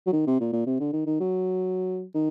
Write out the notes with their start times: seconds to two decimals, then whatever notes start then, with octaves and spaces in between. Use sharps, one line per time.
0.07 F#3
0.13 D#3
0.27 C3
0.40 A#2
0.53 A#2
0.67 C3
0.80 D3
0.93 D#3
1.06 D#3
1.20 F#3
2.14 D#3